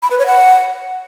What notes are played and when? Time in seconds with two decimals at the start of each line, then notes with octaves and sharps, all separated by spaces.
0.03 B5
0.11 B4
0.19 C#5
0.27 F#5